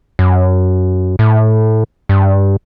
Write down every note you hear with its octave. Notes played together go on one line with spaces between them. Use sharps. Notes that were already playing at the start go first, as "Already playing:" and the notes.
F#2
A2
G2